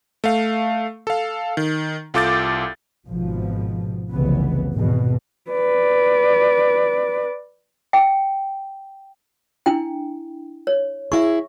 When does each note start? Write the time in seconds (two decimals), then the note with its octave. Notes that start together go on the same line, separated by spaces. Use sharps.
0.24 A3 F5
1.07 A4 F5
1.57 D#3
2.14 C2 F4 A4 D6 G6 A6
3.07 G#1 B2 F3
4.10 F1 C2 C#3 E3 B3
4.73 G#1 E2 B2
5.51 B4 D5
7.93 G5
9.66 D4 E4 G5
10.67 C#5
11.12 E4 G#4 E5 C#6